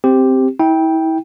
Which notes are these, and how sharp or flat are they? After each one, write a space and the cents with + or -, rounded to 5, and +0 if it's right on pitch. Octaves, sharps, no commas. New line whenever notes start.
C4 +0 G4 +0
E4 -35 G5 +0